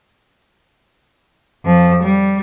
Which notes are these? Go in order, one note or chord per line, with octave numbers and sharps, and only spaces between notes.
F2 F3
G3